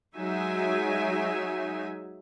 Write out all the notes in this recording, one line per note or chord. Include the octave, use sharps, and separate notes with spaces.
F#3 G#3 D#4 E5 G#5